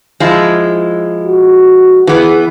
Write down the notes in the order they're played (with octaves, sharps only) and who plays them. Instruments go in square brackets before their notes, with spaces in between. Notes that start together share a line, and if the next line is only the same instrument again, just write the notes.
[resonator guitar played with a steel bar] F3 G#3 E4
[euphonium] F#4
[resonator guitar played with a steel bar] E3 B3 [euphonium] G#4